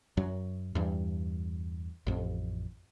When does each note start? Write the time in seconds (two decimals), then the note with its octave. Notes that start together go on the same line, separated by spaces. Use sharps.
0.17 F#2 F#3
0.75 E2 G2
2.07 A1 F2